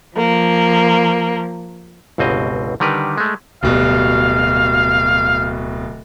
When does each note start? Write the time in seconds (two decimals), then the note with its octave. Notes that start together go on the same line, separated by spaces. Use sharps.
0.16 F3 A#3
2.18 G1 C#2 B2 C4 D#5
2.80 D3 D#3 G3 A#4 B4
3.18 G#3 A3
3.63 D1 B2 G3 F5